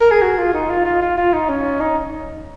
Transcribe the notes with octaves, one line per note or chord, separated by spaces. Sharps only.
A#4
G#4
F#4
F4
D#4
F4
F4
F4
F4
D#4
C#4
D#4